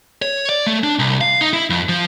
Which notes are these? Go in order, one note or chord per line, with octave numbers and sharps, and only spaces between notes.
C#5
D5
A3
D4
C2
F5
D#4
E4
F2
F3